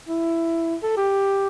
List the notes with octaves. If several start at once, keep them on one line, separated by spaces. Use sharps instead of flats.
E4
A4
G4